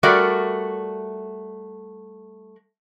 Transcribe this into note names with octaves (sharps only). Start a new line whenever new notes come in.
G3 A3 F#4 A#4 D5